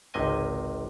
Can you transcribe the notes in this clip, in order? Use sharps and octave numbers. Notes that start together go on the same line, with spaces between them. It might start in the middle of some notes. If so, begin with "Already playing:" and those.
G#1 C#2 C3 D#3 D#5 G#5